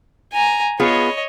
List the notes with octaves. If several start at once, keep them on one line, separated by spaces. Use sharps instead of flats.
G#5 A#5
B3 F4 G#4 C#5 D#5